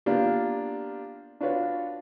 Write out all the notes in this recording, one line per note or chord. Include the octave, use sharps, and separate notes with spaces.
A#3 B3 D4 F4 G4
D4 F4 F#4 B4 C#5